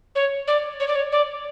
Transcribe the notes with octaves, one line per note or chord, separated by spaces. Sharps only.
C#5
D5
C#5
D5
C#5
D5